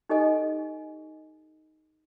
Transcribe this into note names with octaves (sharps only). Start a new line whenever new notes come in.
D#4 G4 A4 D#5 G#5